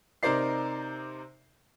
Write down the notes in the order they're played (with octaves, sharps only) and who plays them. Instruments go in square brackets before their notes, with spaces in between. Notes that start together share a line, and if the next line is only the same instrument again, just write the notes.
[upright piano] C3 D#4 A#4 C5 D5 C7